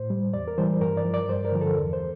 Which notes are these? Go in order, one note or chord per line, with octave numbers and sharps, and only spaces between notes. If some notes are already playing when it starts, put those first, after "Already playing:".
Already playing: A2 C5
G3
E2 D5
A#4
E3 G3 C5
G2 A#4
D5
F3
D5
G2 C5
A#4
D3 F3
A4
E2
C5